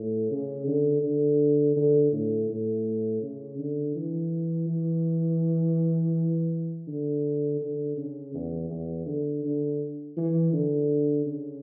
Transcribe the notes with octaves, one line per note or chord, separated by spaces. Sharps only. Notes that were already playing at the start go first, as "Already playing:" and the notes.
Already playing: A2
C#3
D3
D3
D3
A2
A2
C#3
D3
E3
E3
D3
D3
C#3
E2
E2
D3
D3
E3
D3
C#3